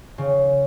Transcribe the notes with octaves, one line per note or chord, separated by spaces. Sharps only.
C#3